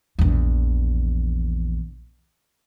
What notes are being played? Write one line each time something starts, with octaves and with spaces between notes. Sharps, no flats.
A#1 E2